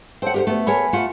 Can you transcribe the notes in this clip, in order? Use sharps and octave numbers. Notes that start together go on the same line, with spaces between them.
A4 C5 C#5 F#5 G5
D2 G4 A#4 C5
A3 B3
A4 A#4 C#5 G#5 B5
A3 F4 F#5